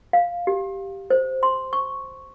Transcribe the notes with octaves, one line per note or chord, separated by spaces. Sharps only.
F5
G4
C5
C6
C#6